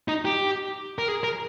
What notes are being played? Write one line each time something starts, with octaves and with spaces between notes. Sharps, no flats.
D#4
G4
A#4
G#4
A#4